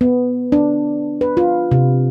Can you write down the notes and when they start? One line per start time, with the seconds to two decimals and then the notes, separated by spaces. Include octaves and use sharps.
0.01 B3
0.52 D4
1.21 B4
1.37 F4
1.71 C3